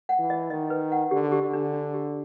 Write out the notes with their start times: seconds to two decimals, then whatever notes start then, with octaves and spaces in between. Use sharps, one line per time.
0.09 F#5
0.19 E3
0.30 D#5
0.50 D#3 D#5
0.70 B4
0.92 F#5
1.11 D3 G4
1.32 G4
1.43 D3
1.53 D4
1.73 D4
1.94 G4